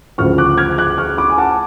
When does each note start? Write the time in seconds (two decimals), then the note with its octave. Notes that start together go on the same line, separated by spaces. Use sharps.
0.18 D2 C#3 F3 C#6 F6
0.38 D6 F#6
0.58 F6 G#6
0.78 D6 F#6
0.98 C#6 F6
1.17 B5 D6
1.30 G#5
1.38 F#5 A5